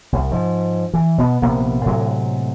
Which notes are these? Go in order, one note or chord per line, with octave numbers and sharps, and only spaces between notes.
C2
G#2 F3
E3
B2 B3
A#1 C3 A#3 B3
A2 C3 F#3 G#3